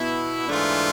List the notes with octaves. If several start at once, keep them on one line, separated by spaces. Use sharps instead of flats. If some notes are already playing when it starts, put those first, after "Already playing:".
Already playing: B2 B3 E4
G#2 E3 A3 D4 F4